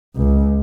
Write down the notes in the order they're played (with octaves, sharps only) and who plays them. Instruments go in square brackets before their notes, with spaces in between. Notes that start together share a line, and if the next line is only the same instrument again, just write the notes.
[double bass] C#2